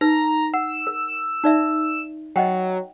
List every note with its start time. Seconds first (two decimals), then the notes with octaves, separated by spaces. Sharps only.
0.01 D#4 B4 A#5
0.54 F#5 E6
0.87 A#4
1.44 D#4 D5 E5
2.36 F#3 D#5 F#5 G5